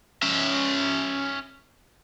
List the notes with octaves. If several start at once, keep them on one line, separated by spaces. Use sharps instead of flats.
C#4 E5